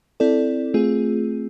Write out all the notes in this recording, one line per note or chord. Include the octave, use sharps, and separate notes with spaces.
C4 E4 A4 D5
A3 C4 F4 G#4